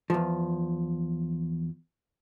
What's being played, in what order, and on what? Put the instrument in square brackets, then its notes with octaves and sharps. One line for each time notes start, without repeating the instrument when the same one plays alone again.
[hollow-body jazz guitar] E2 F3